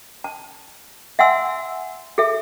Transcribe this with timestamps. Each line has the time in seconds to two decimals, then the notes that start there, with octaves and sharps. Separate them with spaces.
0.24 A5
1.19 E5 F#5 G#5 C6 E6
2.18 G#4 A4 E5